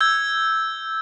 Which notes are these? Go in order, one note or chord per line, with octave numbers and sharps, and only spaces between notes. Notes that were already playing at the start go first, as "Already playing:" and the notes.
E6 G6 G#6